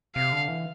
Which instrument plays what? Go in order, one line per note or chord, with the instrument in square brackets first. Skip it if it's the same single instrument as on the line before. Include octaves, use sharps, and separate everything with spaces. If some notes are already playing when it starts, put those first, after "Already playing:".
[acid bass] C3 [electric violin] F5
[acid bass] D3
E3